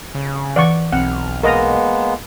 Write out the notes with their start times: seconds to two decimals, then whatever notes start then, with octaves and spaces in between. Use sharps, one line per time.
0.15 C#3
0.56 E3 D5 F#5 C#6
0.92 B1 C4 F#5 F6
1.43 G#3 A#3 B3 A#4 D#5 A#5